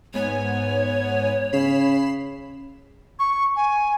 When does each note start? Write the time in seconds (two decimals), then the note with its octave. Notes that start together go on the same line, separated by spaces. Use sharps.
0.14 G#2 B3 C#5 G#5
1.53 C#3 B5 C7 E7
3.19 C#6
3.56 G#5